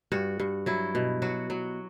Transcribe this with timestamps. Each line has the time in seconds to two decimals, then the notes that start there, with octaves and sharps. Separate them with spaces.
0.12 G2 F#4
0.40 G2
0.66 F#3 E4
0.95 B2
1.22 F#3 F#4
1.50 F#3